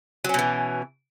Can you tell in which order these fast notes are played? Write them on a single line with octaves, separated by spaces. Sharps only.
F#3 C#4 B2 E3